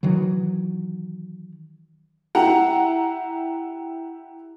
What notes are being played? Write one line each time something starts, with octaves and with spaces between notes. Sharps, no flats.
D#3 E3 F#3
E4 G4 F#5 A#5